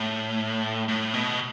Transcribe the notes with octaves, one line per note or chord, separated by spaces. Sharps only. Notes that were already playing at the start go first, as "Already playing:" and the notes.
Already playing: A2
A2
B2